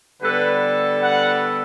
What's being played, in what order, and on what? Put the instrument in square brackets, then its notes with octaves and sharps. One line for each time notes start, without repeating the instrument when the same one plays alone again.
[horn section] D3 G3 B3 D4 A4 [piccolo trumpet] B4
[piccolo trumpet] F#5